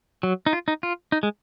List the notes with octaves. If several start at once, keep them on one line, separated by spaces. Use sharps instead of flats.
F#3
D#4
F4
D#4
F4
D#4
G#3